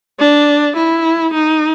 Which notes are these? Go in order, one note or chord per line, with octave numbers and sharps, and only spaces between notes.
D4
E4
D#4